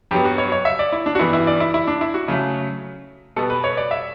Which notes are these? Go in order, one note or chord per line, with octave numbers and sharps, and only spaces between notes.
G2 F#3 B3 G4
F#4
C#5
C#5
E5
D5
E4
D4
F#4
G2 E3 B3 E4
E4
D5
E4
E4
D4
E4
F#4
C#3 F#3 A3
B2 G3 B3 A4
B4
C#5
D5
E5